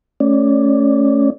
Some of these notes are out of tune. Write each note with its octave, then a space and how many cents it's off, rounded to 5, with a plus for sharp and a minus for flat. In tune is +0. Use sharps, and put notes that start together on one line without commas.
A3 +0 C#4 +0 D5 +5